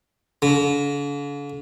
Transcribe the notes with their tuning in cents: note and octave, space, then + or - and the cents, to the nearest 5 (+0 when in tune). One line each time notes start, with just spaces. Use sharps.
D3 -45